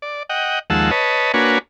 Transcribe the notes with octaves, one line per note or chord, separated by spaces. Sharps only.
D5
D#5 F#5 G5
D#2 F3 G#3 F#5 A5 E6
B4 C#5 D#5 A5
A#3 D4 F#4 B4 C#5 G#5